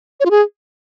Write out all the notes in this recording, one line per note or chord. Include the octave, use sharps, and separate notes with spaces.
C#5
F4
G#4